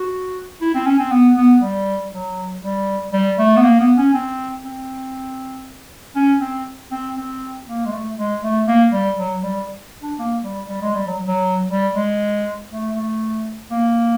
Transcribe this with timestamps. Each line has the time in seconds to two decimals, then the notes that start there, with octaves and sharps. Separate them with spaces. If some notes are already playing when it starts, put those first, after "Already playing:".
Already playing: F#4
0.61 E4
0.74 C4
0.86 C#4
0.99 C4
1.12 B3
1.37 B3
1.62 G3
2.12 F#3
2.63 G3
3.13 G3
3.39 A3
3.56 B3
3.64 A#3
3.81 B3
3.98 C#4
4.14 C4
4.65 C4
6.16 C#4
6.41 C4
6.91 C4
7.16 C4
7.67 A#3
7.86 G#3
7.92 A3
8.17 G#3
8.43 A3
8.68 A#3
8.93 G3
9.18 F#3
9.43 G3
10.02 D4
10.19 A#3
10.44 G3
10.69 G3
10.82 G#3
10.95 G3
11.07 F#3
11.27 F#3
11.70 G3
11.95 G#3
12.71 A3
12.96 A3
13.71 A#3